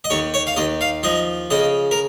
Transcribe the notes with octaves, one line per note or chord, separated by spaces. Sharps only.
D#5
D#2 C#5
C#5
F5
D#2 D#5
F5
F3 D#5
C#3 D#5
A#4